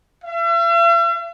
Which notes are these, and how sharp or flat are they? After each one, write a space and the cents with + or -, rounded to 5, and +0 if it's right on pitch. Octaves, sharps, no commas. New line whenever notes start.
E5 +45